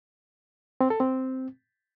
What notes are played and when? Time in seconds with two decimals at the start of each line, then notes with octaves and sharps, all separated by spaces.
0.81 C4
0.90 A4
1.00 C4